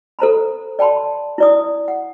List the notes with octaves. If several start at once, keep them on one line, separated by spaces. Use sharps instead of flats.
A4 C5 A#5 B5
D5 G5 A5 B5 C6
E4 D5 D#6
F#5